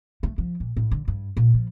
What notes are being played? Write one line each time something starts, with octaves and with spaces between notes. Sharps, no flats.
A3
F3
A#2
A2
D3
G2
A#2
F3